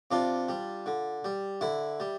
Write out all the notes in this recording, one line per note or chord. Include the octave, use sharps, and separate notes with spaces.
C3 D4 F4
G3
D3
G3
D3 E4
G3